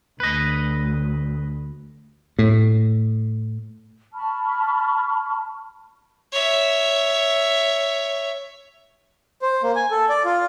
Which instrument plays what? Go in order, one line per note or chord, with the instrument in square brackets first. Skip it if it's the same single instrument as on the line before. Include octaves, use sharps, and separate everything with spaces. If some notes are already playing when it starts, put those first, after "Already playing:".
[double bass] D2 [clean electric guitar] B4 D#5
[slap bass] A2
[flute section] A5 B5 C#6 F6
[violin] C#5 E5
[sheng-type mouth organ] C5
A#3
G#5
A4
D5
F4